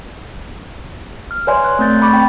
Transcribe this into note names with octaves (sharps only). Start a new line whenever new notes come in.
F6
B4 C#5 D5 E5 G#5 C6
C6 F#6
A3 B3 C4 G6 A6
B5 C#6 D6 A6
C4 G5